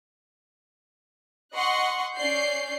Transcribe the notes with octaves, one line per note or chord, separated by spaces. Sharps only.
D#5 F#5 C6 C#6 F#6
C#4 D5 G6 C7